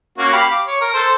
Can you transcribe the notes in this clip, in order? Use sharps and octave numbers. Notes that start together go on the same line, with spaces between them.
A#3 C#4 F#4
G4 F5 B5
D6
C#5
A#4
A4 C5